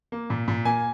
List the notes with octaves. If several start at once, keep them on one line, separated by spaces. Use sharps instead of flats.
A#3
A#2
A#2
A#3 G#5